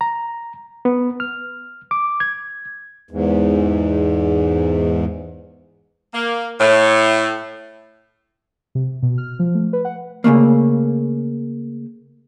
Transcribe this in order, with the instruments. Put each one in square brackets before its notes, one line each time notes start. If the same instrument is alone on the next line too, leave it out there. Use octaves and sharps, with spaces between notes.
[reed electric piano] A#5
B3
F6
D6
G#6
[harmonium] E2 G#2
[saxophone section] A#3
A2
[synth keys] C3
B2
F6
F3
A3
B4
F#5
[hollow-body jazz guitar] C#3 F3 A3 A#3